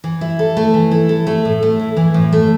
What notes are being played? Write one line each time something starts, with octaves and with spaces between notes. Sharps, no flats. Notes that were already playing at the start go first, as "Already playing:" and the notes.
E3
E4
A4
A3
E3
E4
A4
A3
A2
A3
E4
E3
A2
A3